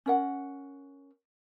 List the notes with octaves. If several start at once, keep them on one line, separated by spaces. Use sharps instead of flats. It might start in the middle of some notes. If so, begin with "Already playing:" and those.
C#4 A#4 F#5